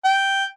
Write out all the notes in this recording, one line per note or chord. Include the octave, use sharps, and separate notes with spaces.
G5